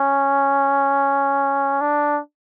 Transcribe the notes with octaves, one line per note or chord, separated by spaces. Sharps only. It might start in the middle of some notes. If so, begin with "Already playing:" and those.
Already playing: C#4
D4